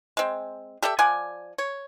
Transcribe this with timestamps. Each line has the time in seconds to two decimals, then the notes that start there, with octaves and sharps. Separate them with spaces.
0.17 G#3 C4
0.83 G4 A4 D5 E5
0.99 F3 D5 F#5 G#5
1.58 C#5